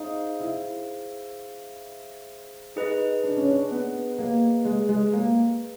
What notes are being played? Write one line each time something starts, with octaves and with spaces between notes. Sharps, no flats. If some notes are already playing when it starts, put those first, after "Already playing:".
Already playing: D#4 G#4 C5 F5
E4
D#4 G#4 B4 D#5
D4
C#4
D4
B3
A#3
G#3
G#3
A#3